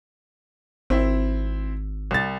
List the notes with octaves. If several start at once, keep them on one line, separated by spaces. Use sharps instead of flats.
G#1 C4 E4
C2 A6